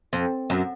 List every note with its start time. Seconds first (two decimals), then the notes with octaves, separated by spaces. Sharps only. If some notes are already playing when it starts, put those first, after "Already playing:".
0.13 F2
0.50 F#2